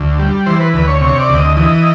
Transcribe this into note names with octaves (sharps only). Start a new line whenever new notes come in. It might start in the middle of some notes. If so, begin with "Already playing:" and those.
Already playing: D2
G3
E3 C5
B4
D2 B4
C#5
C3 C#5
D5
D2
D#5
E3 D#5